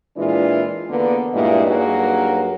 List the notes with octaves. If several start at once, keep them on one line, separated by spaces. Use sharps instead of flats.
A#2 E3 G#3 D4 E4 F4
E2 D3 A#3 B3
G2 A#2 G#3 A#3 E4 D#5
G2 F#3 A#3 D#4 F#4 G#4